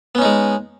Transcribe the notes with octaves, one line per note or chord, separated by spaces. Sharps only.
G#3 B3 C#4 D#4